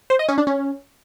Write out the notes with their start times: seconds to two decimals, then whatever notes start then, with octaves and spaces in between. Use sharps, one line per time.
0.10 C5
0.19 D#5
0.28 C#4
0.38 D4
0.47 C#4